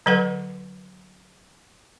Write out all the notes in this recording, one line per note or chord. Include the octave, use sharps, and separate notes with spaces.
D3 F#3 A4 B4 F#5